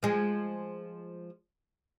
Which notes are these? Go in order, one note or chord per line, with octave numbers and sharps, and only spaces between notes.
F3 G#3